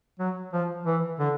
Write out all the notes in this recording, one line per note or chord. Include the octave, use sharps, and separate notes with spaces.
F#3
F3
E3
D3